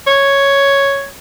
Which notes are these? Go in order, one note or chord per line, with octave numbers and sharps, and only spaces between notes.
C#5